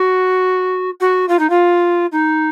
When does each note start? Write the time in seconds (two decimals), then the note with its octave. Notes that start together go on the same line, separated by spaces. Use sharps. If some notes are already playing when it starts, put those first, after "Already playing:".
Already playing: F#4
1.00 F#4
1.28 F4
1.39 D#4
1.50 F4
2.12 D#4